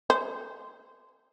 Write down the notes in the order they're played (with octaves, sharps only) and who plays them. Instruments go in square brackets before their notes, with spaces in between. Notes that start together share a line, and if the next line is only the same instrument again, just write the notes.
[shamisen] C5